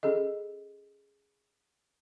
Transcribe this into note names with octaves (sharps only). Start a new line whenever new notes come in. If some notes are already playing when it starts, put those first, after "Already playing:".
C#4 G#4 A4 D#5